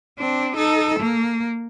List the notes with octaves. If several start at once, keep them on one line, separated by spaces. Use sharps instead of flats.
C4 D4
D#4 A4
A#3